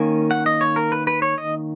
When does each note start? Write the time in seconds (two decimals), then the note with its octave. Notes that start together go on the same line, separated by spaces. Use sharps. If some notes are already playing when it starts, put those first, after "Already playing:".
Already playing: D#3 A#3 C#4 G#5
0.31 F#5
0.46 D#5
0.61 C#5
0.76 A#4
0.92 B4
1.07 B4
1.22 C#5
1.38 D#5